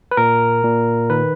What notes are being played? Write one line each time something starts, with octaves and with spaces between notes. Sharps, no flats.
B4
A#2 A#4
A#2
D#3 B4